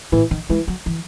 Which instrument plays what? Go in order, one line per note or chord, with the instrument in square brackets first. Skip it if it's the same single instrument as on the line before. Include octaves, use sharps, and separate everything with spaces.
[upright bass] A2 [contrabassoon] E3
[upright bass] D#3
[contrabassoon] E3 [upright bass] G#3
[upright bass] F#3
E3